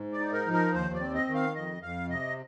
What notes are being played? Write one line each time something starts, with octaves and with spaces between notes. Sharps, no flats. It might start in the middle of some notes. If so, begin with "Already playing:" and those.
Already playing: G#2
D5
D#4
A#4
F3
A#4
D#2 C5
D5
C4
D#5
D#3
F5
F2 D#5
F2 F5
C3 D#5